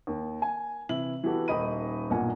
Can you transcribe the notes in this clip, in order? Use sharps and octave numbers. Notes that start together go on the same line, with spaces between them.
D#2
G#5
C3 E3 E4 F#7
E3 B3 F#4 G4 A4
D#1 D#3 D#4 D#5 B5 D#7
B1 G2 A#2 A#3 F#5 G#5